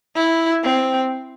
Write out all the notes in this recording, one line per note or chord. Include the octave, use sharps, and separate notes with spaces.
E4
C4